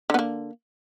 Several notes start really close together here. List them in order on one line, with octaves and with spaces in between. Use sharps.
D3 B3 A#3